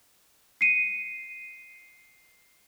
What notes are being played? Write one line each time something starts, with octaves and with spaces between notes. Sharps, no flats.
C7 C#7 D#7